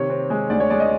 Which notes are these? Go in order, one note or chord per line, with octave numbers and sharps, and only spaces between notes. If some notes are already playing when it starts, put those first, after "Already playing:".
Already playing: C3 D#3 C#5
C4
G#3
D2 D5
C#5
G#3 D5
D#5